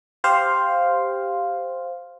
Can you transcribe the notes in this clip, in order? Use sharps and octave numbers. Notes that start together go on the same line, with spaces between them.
G4 C5 F5